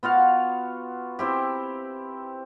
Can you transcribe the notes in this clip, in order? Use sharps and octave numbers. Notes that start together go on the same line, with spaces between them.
B3 F4 F#4 F5
C4 E4 G4